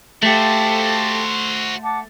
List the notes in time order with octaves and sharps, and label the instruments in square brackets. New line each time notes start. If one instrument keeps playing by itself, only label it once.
[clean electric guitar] A3 [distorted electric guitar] F#4 C5 [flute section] G4 A4 F5
[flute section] F#5 A5 D6